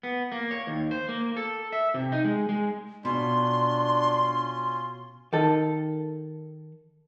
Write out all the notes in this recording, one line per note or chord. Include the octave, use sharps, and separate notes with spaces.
B3
A#3
C#5
D#2
C5
A#3
A4
E5
C3
D#4
G#3
G#3
B2 C#4 D4 F4 C6
D#3 A4